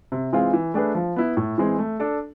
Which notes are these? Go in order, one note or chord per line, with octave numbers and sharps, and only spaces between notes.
C3
E3 G#3 C4 F4
E3
A3 D4 G#4 B4
F3
B3 E4
A2
E3 G#3 C4
A3
D4 A4